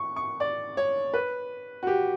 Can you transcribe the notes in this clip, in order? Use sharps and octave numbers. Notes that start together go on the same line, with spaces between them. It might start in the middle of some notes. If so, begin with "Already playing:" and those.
Already playing: C#6
C#6
D5
C#5
B4
F#4
G4